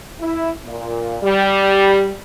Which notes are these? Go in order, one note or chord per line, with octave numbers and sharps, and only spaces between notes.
E4
A#2
G3